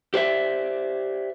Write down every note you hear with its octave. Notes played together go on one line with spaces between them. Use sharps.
G4 C5 D5 E5